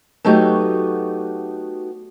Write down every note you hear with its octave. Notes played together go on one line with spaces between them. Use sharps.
F#3 A3 B3 D#4 F#4 G4